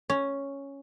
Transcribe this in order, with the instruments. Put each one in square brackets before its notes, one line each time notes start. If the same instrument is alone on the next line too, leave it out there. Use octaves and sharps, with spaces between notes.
[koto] C#4